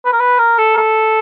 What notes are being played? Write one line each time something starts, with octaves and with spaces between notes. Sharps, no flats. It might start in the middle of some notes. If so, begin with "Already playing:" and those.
B4
A#4
B4
A#4
A4
A#4
A4